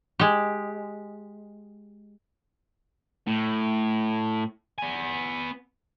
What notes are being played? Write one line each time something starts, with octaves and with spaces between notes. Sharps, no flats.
G#3 G4
A2
B3 G#5